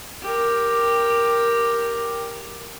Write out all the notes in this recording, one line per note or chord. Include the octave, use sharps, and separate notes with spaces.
G4 A#4